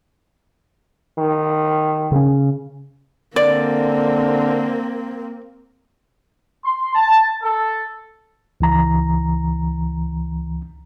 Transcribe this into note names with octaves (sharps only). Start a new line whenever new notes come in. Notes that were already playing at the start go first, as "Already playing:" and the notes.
D#3
C#3 C#4
D3 A#3 C4 D5
C6
A5
A4
C#2 E3 A#5